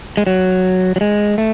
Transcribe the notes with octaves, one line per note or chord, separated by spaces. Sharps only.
G#3
F#3
F#3
G#3
A3